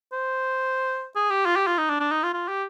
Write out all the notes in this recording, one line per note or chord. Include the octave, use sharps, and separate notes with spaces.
C5
G#4
G4
F4
G4
F4
D#4
D4
D4
D#4
F4
F4
G4